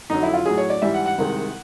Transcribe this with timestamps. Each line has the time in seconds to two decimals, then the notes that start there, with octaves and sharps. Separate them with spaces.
0.10 F2 D3 F#3 D#4
0.23 E4
0.34 F4
0.45 A2 F#3 G#4
0.58 C#5
0.70 D5
0.82 G#2 E3 G3 E5
0.94 F#5
1.06 F#5
1.18 C2 C3 D#3 G#3